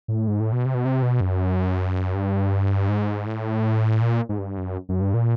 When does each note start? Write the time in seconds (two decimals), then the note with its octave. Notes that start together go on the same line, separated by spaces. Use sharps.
0.08 A2
0.28 G#2
0.40 A2
0.52 B2
0.65 C3
0.74 B2
0.85 C3
1.02 B2
1.21 F#2
2.15 G2
2.89 G#2
3.27 A2
4.02 A#2
4.29 G#2
4.39 G2
4.58 F#2
4.89 F#2
5.01 G2
5.14 A#2